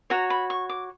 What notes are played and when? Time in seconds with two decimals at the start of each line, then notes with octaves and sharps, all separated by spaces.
0.10 F#4 C#5 A#5
0.30 B5
0.50 C#6
0.69 D6